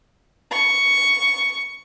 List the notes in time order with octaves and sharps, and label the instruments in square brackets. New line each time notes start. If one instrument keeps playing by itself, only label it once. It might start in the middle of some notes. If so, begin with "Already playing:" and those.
[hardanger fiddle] C#6